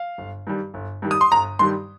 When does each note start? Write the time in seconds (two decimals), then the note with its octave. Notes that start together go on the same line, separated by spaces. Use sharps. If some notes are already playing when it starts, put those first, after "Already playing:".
Already playing: F5
0.18 G1
0.47 G2 D#3 G3
0.74 G1
1.02 G2 D#3 G3
1.11 D#6
1.21 C6
1.32 G1 A#5
1.59 G2 D#3 G3 C6